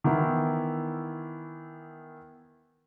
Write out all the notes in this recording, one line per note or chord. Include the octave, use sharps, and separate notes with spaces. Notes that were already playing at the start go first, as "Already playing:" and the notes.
D#3 E3 B3 E4